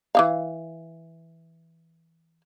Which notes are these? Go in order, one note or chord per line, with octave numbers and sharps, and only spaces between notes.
E3 D#4 F5